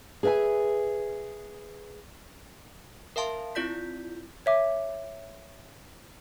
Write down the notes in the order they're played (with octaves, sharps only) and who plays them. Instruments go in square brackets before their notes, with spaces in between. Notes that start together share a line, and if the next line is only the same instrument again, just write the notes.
[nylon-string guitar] G#4 B4 D#5 E5 G#5
[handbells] A#4 E5 F5 A5 C6
C4 E4 F4 D5 G6 B6
[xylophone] C#5 E5 D6